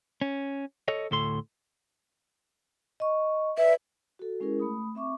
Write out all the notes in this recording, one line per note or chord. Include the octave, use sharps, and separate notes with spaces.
C#4
A4 C#5 D#5
D2 A2 A4 C6
D#5 C#6
B4 D5 E5
F#4 A4
G#3 C#4 E4 G#4 A#4
A3 B5 D#6
C4 E5 C#6 D6